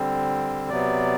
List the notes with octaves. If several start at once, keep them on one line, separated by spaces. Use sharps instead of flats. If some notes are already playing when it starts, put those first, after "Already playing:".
Already playing: D3 G3 C4
C3 F#3 B3 D5